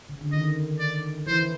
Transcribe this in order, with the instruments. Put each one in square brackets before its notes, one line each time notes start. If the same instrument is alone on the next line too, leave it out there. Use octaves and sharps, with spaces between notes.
[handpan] C#3
D3
[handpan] D#3 [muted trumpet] D#5
[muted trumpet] D5
[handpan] E3 [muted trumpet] C5